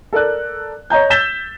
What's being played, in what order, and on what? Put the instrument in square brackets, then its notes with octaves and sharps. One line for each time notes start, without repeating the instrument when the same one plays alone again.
[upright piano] A4 A#4 D5 F#6
C#5 D#5 A#5 G6
E6 G6 A6 B6 E7 G7